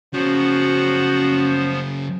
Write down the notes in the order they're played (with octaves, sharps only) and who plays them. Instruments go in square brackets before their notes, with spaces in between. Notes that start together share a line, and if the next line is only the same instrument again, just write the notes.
[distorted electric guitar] C#3 F#3 [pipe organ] F3 B3 C5 [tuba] C#4 [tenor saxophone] F#4